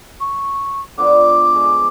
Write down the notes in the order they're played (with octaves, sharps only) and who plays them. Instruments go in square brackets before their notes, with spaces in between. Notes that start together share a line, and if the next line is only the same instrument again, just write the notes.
[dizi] C#6
[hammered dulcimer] D3 F3 B3 [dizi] D6
[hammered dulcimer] G#3